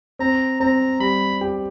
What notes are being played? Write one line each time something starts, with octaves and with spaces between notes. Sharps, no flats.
C4 A#5
C4 A#5
G3 B5
G4